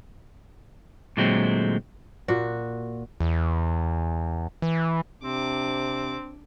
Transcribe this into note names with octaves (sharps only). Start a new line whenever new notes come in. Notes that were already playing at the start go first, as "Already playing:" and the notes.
A#2 D3 F#3 G#3 A3 C4
A#2 F#4
E2
E3
C3 C4 D4 D6